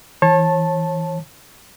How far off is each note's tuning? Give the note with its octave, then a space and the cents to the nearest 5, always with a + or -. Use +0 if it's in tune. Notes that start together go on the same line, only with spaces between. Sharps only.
E3 -15 C#5 -35 A5 +0